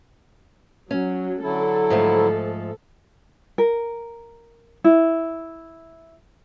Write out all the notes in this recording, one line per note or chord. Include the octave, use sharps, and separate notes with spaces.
F#3 C#4
D3 F#3 E4 A4
G#2 F3 A3
A#4
E4